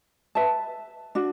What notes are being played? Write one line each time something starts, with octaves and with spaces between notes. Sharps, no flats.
B4 E5 A5
D4 F#4